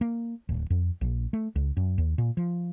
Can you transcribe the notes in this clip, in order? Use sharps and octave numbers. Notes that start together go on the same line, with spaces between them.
A#3
D1
F2
A#1
A3
C#2
F#2
D#2
A#2
F3